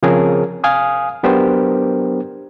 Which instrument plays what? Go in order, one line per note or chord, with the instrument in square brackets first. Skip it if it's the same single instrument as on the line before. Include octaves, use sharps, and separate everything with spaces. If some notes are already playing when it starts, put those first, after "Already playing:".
[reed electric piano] C#3 F3 C4 G#4 A#4 C#5
F5 G#5 D#6
F#3 B3 D4 G4 A#4 C5